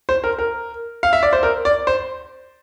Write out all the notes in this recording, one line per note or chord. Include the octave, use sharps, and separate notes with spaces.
C5
A#4
A#4
F5
E5
D5
C5
A#4
D5
C5